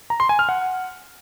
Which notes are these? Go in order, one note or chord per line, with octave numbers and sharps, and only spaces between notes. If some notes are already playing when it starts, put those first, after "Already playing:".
A#5
C6
G#5
F6
F#5